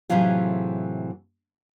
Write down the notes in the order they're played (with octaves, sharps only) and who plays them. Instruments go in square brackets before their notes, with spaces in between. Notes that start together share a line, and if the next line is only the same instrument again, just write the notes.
[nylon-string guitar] A2 C3 E3 F#3 F4 G#4